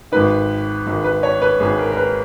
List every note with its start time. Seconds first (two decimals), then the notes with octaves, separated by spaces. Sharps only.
0.12 G#1 G#2 D#3 B4
0.86 G#1 G#2 D#3
1.04 B4
1.23 C#5
1.42 B4
1.60 G#1 G#2 D#3 G#4
1.79 A#4
1.92 A#4
1.97 B4